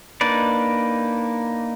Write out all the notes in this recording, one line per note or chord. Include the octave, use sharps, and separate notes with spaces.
A#3 D4 D#4 B4 D5